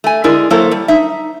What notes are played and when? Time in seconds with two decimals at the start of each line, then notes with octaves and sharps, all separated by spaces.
0.04 A3 G#5
0.24 D3 G#3 E4 G#4 A#4 D5
0.50 F#3 A#3 E4 A4 A#4 C5
0.71 G3
0.88 D#4 E5